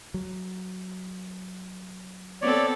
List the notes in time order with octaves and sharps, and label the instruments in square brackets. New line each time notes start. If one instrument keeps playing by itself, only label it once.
[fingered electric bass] F#3
[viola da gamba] B3 C4 A4 [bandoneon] C#5 D5